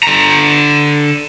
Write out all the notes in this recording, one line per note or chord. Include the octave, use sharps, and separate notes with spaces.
D3 A#5